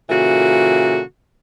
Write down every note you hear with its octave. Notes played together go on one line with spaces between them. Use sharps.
A#2 C#3 E3 F#4 A4